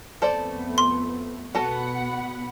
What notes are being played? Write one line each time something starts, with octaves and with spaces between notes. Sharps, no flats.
F2 A3 B3 A4 C5 D5
C6
B2 B3 F#4 A4 F#5 B5